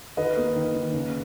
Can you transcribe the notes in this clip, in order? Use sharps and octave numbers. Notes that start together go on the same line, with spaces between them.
D#3 B4 D#5
A#3
D#3
D#3
C#3